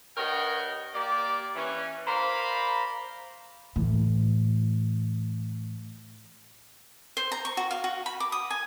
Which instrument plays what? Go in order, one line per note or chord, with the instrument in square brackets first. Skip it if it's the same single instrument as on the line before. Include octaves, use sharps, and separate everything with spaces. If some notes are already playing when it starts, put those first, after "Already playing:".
[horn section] G2 A#4 C#5 D#5 F#5 G5
A#3 G4 D5
E3 C#4
A#4 C5 D5 F5 A#5 B5
[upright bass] A2 E3
[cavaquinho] C5
A#5
C#6
F#4
F5
F#4
B5
D6
D#6
G#5